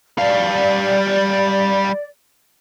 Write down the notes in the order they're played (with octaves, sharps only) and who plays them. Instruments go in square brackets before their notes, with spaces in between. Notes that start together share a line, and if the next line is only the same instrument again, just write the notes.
[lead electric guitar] G3 F5 [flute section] D5